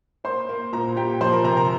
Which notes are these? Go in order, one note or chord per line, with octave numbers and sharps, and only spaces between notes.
A#3 C5 C6
A#3
A#2 A#4 A#5
A#2 G4 G5
F3 C5 C6
A#4 A#5
C3 A#4 A#5
A#4 A#5